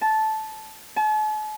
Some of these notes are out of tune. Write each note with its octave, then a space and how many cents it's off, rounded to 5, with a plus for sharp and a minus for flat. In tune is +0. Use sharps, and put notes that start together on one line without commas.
A5 -10
A5 -45